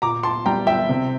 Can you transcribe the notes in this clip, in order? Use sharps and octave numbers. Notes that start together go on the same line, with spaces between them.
A#2 A#5 D6
A5 C6
G3 G5 A#5
E5 G5
C3